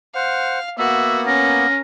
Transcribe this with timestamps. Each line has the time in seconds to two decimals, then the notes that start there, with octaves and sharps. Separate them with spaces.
0.15 C5 F5 F#5
0.79 A#3 B3 F#4 E5
1.27 C#4 A#4